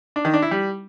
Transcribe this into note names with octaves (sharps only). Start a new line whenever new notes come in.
D4
D#3
D4
E4
G3